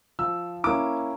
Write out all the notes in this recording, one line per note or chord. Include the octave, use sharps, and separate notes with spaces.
F3 E6
A#3 C#4 E4 D6